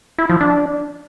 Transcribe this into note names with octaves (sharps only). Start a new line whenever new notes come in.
E4
F3
D4